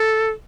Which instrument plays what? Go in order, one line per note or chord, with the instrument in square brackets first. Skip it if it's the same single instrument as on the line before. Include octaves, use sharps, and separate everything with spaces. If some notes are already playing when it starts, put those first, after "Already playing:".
Already playing: [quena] A4